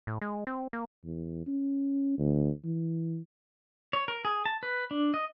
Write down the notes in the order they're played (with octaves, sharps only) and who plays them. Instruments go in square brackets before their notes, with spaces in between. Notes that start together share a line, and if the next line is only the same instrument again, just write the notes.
[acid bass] A2
G#3
C4
A#3
[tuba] E2
C#4
D2
E3
[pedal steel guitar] C#5
A#4
G#4
A5
B4
D4
D#5